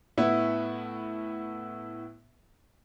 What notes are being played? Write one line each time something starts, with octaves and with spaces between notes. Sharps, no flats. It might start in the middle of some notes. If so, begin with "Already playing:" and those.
A2 B3 E4